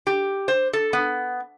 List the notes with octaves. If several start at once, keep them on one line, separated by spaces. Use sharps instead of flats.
G4
C5
A4
B3